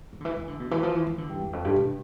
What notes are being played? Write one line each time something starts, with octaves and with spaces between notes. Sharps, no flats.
F3
D3
E3
E3
D3
B2
E3
F3
E3
E3
D3
G2
E2
F2
G2
B2